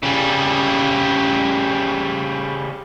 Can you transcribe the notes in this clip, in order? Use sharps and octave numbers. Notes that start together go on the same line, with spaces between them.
C#3 G3